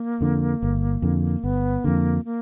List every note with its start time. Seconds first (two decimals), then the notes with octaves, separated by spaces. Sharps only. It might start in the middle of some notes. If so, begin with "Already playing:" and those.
Already playing: A#3
0.21 F2 D3
0.63 G1
1.02 F2 D3
1.44 G1 B3
1.84 F2 D3 A#3
2.25 A#3